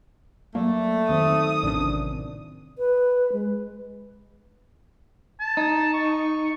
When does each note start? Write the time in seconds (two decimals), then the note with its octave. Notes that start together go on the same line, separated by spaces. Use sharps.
0.55 F#3 A3 A#3 D5
1.09 D#3 C4 C5 D#6
1.63 A1 C3 C#4 D4 D5
2.78 B4
3.33 G#3
5.40 A5
5.57 D#4
5.94 C#6